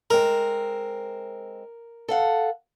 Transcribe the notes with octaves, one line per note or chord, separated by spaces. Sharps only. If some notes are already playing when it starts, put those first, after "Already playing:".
G#3 C4 A#4
A4 F5 F#5